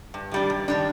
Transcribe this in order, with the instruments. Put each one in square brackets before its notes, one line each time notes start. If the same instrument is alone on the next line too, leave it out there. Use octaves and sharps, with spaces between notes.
[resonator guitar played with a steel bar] G2
D#3 G3 D4
G2
D#3 G3 D4